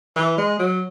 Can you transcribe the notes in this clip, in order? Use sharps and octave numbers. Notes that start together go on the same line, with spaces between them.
E3
G#3
F#3